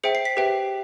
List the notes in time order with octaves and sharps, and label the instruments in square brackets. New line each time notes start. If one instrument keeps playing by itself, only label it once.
[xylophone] G#4 C5 E5 G5 C#7
C7
B6
G4 B4 E5 G5